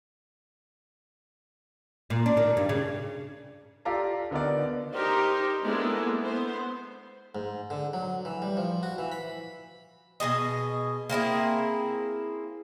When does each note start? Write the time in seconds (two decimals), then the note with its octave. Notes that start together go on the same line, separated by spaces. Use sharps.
2.10 A#2
2.26 D4
2.37 D#3
2.57 G2
2.69 C#3
3.85 F4 G4 A4 D5 F5 A#5
4.31 D3 B3 D#4 A#4 D5
4.92 D#4 G4 A#4 C5
5.65 G#3 A#3 B3 D4 E4 A4
6.22 B3 C5
7.35 G#2
7.70 D3
7.93 F#3
8.25 E3
8.42 G3
8.57 F3
8.83 F#4
8.98 E3
9.12 B5
10.20 B2 G#3 G#4 D#5
11.09 A#3 C4 E4 G#4